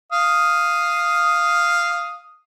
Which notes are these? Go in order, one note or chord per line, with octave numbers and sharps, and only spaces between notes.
F5 D#6